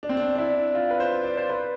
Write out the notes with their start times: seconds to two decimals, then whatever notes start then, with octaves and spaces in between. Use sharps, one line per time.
0.03 D4
0.09 C4
0.17 D4
0.35 D4
0.38 E4
0.75 F4
0.91 B4
1.00 C5
1.24 D5
1.37 C5
1.50 B4